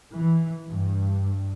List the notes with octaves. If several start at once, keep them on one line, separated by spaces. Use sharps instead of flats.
E3
G2